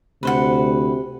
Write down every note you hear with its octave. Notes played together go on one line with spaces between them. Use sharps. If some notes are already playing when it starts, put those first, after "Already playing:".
D2 C3 B4 C5 F#5